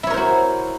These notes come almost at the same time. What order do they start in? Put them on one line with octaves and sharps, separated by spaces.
E4 C#5 A#4 C5 F#4